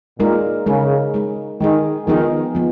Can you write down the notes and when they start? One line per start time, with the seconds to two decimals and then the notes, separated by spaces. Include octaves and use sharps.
0.19 A#2 G#3 D#4 A#4
0.66 C#3 G#3 D#4 A#4
1.14 G#3 D#4 G#4
1.60 D#3 G#3 D#4 G#4
2.07 D#3 F3 B3 D#4 G#4
2.55 F3 B3